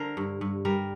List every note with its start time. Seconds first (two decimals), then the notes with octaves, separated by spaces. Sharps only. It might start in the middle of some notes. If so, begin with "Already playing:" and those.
Already playing: D3 A#4 C5
0.17 G2
0.41 G2
0.65 G3 A#4